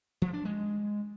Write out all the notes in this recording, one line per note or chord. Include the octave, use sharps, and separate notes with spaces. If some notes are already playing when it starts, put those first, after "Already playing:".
F3
D4
G#3